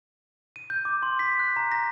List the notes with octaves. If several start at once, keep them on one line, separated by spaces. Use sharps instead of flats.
D#7
G6
D6
C6
B6
F#6
A#5
A#6